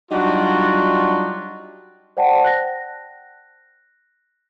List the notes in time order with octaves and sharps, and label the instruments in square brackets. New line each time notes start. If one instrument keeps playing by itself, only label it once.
[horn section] F#3 G3 D4 D#4 F4 F#4
[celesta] C5 D5 F#5 G5 A5
F#6 A#6